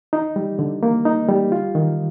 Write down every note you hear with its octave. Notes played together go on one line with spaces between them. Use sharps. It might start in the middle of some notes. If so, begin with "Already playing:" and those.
D#4
G3
D3
A#3
D#4
G3
F4
D#3